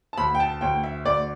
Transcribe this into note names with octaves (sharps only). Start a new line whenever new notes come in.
A5
D2 B5
G5
A5
D2 G5
E5
D2 D5